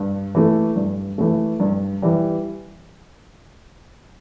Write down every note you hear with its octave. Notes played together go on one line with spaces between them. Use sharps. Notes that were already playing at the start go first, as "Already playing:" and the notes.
Already playing: G2
E3 A3
G2
E3 A3
G2
E3 G3